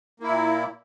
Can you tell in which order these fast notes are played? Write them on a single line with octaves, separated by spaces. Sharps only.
A#3 E4 A#2